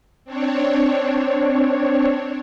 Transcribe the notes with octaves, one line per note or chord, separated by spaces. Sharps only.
C4 D4 C#5